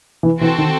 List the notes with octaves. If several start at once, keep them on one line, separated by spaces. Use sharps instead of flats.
E3
E3 C4 F#4 A4
D#3